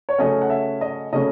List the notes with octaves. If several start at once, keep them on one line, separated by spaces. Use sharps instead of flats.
C#5
C#3 F#3 A3 C#4 D#5
F#5
E5
D#5
C#3 F#3 A3 C#4 D#5